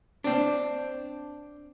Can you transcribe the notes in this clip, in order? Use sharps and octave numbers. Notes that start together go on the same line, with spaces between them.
C4 D4